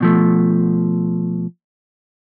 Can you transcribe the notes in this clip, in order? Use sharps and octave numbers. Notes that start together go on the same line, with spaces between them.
B2 F3 A3